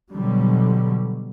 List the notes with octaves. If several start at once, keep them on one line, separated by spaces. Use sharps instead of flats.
B2 D3 F#3 G3